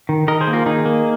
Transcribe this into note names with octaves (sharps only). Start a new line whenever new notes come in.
D#3
D#3 A#4 D#5
G#4 C5
A#3
F4 A#4
D#3 D#4 G#4
A#3